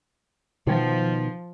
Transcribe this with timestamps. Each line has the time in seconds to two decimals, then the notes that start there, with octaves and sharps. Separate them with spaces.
0.67 B2 D#3 F3